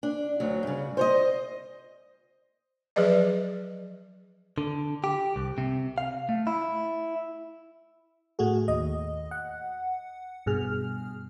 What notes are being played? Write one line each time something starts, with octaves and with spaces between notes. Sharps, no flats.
D4
D2 F#3
G2 C#3
C5 C#5 D#5
F3 F#3 G#4 B4 D5 D#5
D3
G4
C2
C3
F5
A3
E4
A2 A3 F#4 G#4
D#2 D#5
F#5
G2 B2 G#4 F6